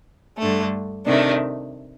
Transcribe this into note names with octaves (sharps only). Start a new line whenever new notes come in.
G2 D3 A3
C3 D#3 A3 D4